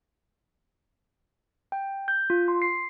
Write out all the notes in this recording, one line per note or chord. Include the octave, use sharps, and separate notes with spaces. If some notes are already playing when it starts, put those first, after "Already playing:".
G5
G6
F4
C6
C7